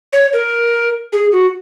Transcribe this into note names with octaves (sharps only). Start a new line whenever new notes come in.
C#5
A#4
G#4
F#4